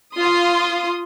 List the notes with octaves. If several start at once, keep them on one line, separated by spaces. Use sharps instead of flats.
F4 C6 D#6